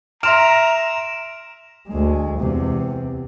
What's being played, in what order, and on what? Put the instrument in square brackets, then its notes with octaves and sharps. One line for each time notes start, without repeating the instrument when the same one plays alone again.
[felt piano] E5 C6 F6 [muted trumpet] A#5 [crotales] D7 E7 F7
[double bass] D2 G#3
E2 C3